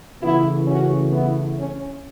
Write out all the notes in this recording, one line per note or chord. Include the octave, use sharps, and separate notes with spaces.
C#3 E3 A3 B3 E4
C#4 F#4
B3 E4
C#4